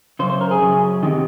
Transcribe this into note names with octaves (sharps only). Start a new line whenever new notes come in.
F#2 C#3 C5
C5
A#4
G#4
F#2 C#3
C3 D#3